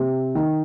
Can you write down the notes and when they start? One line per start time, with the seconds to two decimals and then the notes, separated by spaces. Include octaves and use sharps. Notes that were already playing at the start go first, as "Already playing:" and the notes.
Already playing: C3
0.35 D#3